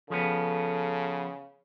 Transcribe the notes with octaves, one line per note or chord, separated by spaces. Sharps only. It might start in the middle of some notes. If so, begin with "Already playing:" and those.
C#3 F3 B3 A4